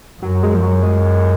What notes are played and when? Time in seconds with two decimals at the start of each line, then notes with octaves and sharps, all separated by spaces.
0.22 F#2 F#3
0.43 G#3
0.54 F3
0.63 F#3
0.83 G#3